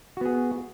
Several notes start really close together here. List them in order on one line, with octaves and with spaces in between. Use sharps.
F#4 B3 G#4